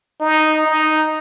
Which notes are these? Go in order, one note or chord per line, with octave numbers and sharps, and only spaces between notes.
D#4
D#4